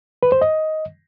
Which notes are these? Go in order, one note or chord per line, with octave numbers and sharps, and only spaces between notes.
B4
C5
D#5